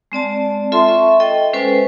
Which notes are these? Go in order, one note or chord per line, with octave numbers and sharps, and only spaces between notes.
G#3 C4 D5 A5
F4 A4 E5 A5 C6
E5 C#6
A4 D#5 G5
G#3 C#4 A4 B4 C5 G#5